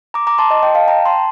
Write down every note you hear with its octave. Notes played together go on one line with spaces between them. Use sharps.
A#5 D6
A#5 D6
A5 C6
D#5
D#5 G5
F5 A5
G5 A#5
A5 C6